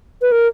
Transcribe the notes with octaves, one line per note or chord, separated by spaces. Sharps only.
B4
A#4